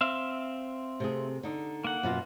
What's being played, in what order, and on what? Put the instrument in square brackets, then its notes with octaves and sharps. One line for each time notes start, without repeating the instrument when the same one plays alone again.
[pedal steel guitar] C4 E5 F5
[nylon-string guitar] C3 A3 G#4
D3 D#4
[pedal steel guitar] A#3 F#5
[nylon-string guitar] F#2 B2 F4